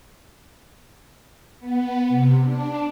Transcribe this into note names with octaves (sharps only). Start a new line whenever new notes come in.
B3
C3
D4